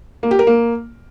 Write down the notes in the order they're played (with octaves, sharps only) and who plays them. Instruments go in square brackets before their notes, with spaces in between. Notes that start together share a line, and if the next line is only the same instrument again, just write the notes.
[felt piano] A#3
G4
A#4
A#3